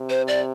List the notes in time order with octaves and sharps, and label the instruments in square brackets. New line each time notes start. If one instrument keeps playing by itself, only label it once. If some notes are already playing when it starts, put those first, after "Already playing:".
Already playing: [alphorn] C3
[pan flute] C5
D5